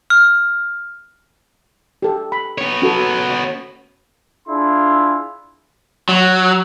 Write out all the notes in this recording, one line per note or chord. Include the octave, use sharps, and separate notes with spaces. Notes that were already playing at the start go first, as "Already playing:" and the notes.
F6
G4 A4
B5
B3 C#5
C#4 F#4 A4
D4 E4 F4 G#4 C6
F#3